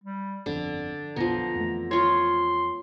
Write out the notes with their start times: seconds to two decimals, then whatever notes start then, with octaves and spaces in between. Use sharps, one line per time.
0.04 G3
0.46 G1 F2 D3 D5
1.16 B1 F2 B2 F3 B3 A#5
1.55 F2 E3 A3
1.91 F4 C#5 C6